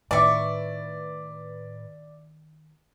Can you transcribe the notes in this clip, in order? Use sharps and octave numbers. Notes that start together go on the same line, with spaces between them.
A2 D#3 B4 D5 E5 C#6 D6